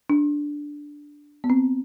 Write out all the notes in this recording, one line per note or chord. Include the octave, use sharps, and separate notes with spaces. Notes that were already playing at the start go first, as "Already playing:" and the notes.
D4
B3
C4